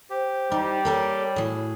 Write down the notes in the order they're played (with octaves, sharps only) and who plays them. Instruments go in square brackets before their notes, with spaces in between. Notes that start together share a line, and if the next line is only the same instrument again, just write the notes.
[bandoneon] G4 [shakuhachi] C5
[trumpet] G3 [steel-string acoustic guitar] D#4
[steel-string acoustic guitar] A#3 A4 A#4 [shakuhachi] C#5
[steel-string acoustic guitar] A2 F#3 [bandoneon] G#4